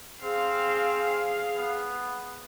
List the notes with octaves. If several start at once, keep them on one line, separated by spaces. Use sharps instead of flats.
C4 G#4 F5
B3